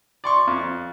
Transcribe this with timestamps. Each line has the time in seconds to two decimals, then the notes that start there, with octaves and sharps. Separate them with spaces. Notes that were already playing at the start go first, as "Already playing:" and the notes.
0.24 D5 C6 C#6
0.47 F2